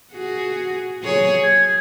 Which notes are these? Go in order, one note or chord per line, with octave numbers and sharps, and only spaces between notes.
F#4 G#4
F#3 G#4 C#5
G#4 G#6